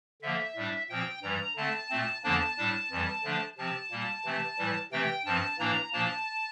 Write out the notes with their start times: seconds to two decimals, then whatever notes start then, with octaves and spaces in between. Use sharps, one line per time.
0.22 D3 F3 A#3 E5
0.56 A2 G3 D4
0.89 A#2 F3 C4 G5
1.23 G2 E3 G3 A#5
1.56 D3 A3 C4 A5
1.90 A#2 A3 C4
2.24 E2 D3 F3 A#3 D4 A5
2.57 A2 G3 D4
2.91 F2 E3 G3
3.24 D3 F3 A3 D4
3.58 C3 F3 C4 A5
3.91 A#2 G3 A#3
4.25 C3 E3 A3 C4
4.58 A2 E3 G3
4.92 C3 E3 A3 C4 G5
5.25 G2 F3 C4 A5
5.59 A2 E3 A#3 D4 A#5
5.93 A#2 F3 A#3 D4 A5